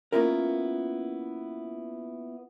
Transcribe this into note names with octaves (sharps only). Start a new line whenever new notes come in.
A#3 B3 C#4 E4 F4 A#4